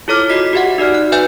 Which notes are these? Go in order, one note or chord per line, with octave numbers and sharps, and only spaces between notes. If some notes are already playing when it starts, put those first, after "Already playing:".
E4 F4 A4 C#5 D6 F6
F#4 D#5 B6
F#4 G4 E5 F#5
D#4 F#4 D5 F6
F#6
B4 E5 G#5 G6